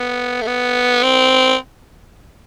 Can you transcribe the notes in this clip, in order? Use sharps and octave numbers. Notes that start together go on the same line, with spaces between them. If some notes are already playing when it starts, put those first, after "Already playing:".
Already playing: B3
A3
B3
C4